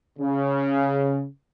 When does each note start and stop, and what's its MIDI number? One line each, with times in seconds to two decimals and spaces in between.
0.19 1.25 49